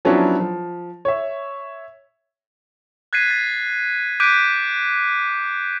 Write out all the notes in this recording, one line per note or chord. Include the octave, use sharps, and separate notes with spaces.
F3 F#3 B3 C#4 D4 E4
F3
C#5 E5
F#6 G#6 A6 B6 C7 D#7
A6
D6 F#6 G6 B6 D7 D#7